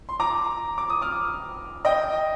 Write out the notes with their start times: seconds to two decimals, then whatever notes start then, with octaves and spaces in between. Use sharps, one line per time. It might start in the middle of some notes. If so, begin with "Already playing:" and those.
0.09 C6
0.20 A#5 D6
0.78 D6
0.90 D#6
1.02 D6 F6
1.85 D#5 G5